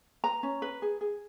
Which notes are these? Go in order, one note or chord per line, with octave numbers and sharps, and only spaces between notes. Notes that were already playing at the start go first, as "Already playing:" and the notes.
B4 A#5
C#4
B4
G#4
G#4